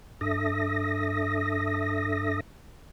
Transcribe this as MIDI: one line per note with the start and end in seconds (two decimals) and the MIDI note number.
0.21 2.40 43
0.21 2.40 62
0.21 2.40 69
0.21 2.40 76
0.21 2.40 87
0.21 2.40 94